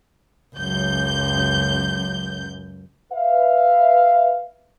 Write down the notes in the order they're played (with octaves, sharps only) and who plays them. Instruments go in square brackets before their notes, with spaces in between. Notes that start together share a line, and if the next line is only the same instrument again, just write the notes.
[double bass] C#2 [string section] F#2 G6
[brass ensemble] B4 E5 F5